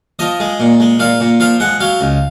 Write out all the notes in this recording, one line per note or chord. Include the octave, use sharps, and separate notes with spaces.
F3 D#5
G#3
A#2
G#3
A#2 F5
A#2
F3 F5
G#3 F#5
F#3 F5
C#2